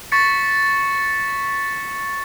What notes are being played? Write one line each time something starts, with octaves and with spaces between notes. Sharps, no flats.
C#6 A6 B6 C#7